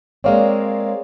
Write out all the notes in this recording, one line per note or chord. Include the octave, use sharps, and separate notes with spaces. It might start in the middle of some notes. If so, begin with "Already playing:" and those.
G#3 A#3 C4 C#5 D5 F5